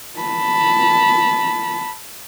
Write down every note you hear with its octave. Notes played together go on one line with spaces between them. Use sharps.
A5 B5